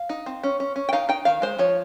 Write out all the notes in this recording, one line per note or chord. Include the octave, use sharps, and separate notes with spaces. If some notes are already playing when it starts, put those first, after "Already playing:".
Already playing: F5
D#4
C4
C#4
C#4
C#4
G5
D#4 F5
D#4 G5
D#3 F5
G#3 C5
F3 C#5